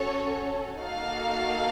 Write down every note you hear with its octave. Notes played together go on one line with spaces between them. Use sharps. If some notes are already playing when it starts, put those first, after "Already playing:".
Already playing: C#4 F#4 A4 C#5
A#3 D#4 F#4 A4 F5